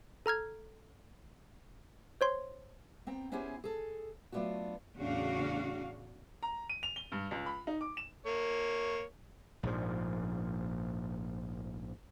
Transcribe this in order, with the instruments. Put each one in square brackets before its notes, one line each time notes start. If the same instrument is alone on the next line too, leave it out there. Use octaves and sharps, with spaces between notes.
[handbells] A4 A#5 F6 G#6
C5 C#5 C6
[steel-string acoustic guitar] B3 C4 G5 A#5
B3 C#4 E4 G4 G#4 C5
G#4 A4
F#3 A3 B3 D4 F4 F#4
[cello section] E2 A2 C#3 D4 F#4 F5
[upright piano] A#5
D#7
F7
G7
G2
C#2
B5
D#4
D6
E7
[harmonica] A#3 C#5
[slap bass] A#1 G#2 F3